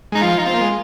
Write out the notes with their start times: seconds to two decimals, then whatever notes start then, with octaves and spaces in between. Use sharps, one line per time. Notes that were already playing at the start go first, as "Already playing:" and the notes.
0.12 G#3 D#4
0.22 F3 F4
0.38 D#4
0.45 C4 F4
0.53 A#3
0.61 G#3